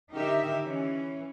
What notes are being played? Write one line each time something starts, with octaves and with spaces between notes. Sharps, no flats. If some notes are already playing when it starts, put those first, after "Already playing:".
D3 D#3 D#4 G4 A#4 E5
E3 C#4